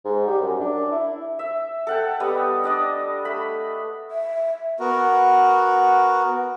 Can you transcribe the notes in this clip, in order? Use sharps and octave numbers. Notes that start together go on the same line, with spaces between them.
G#2
G3
F#2
D4
E4
E5
A4 F#5 G5
G3 B3 D#5
D4 D5 D#5
A3 B5
E5
B3 F#4 A#4